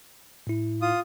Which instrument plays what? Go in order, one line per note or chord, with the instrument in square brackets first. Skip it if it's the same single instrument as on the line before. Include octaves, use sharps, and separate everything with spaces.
[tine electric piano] A2 E4
[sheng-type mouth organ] F4 D#6